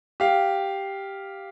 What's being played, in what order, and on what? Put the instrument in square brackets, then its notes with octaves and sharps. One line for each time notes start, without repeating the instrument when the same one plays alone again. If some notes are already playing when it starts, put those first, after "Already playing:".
[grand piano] G4 F5